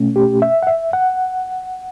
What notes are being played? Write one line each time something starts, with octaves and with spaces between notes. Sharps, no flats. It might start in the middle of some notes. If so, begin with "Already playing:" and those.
Already playing: B2 A3 C#4
G4
E5
F#5
E5
F#5